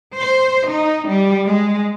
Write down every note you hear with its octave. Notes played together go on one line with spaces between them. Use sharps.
C5
D#4
G3
G#3